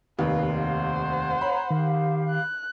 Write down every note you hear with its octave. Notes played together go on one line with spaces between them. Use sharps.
F1 D#2 B4 F5
C5 F#5
C#5 A#5 B5
D#3 G4 F5
F#6